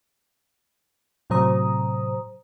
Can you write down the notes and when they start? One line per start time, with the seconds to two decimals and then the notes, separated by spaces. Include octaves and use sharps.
1.30 A2 C3 F#3 C5 A#5 D#6